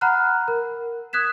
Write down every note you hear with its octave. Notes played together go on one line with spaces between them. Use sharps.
F#5 A#5 B5 F6 F#6
A#4
D#6 F#6 G#6 B6 E7